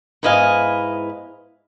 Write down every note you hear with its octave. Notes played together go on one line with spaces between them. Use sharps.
G#2 B3 E4 D#5 F5 G#5